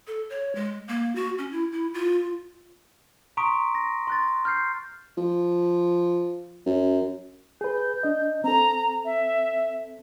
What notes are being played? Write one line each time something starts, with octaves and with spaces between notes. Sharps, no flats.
A4
C#5
G#3
A#3
F#4
C#4
E4
E4
F4
A#5 C6 C#6 D#6 B6 D7
A#6
C6 F#6 A6
F6 G6 C7
F3
F#2
G#4 B4 G6
D4 D#5
C4 A4 A#5
E5